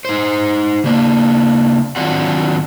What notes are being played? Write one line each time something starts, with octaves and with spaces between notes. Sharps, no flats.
D#4 C5
C#3 A#3 D4
D#3 F#3 C4 D4 F4 F#5